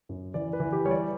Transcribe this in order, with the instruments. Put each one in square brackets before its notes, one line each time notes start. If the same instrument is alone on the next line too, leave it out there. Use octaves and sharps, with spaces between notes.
[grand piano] F#2
E3 D5
B4
E3
G4
G3 C#5
D5